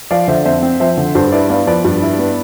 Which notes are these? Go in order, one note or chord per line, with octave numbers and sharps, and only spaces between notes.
F3 D5 F5
D3 C5 E5
F2 C5 E5
C4
F3 C5 E5
D3
G2 A4 C5
E4 B4 D5
B3 D5 F5
F3 B4 D5
G2
E4
B3